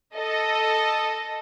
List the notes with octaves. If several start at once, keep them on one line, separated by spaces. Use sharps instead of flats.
A4 D#5